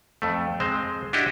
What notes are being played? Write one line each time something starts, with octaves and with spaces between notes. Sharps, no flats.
F2 A3
G#3 C4 C5
D4 E4 F#4 G4 D#5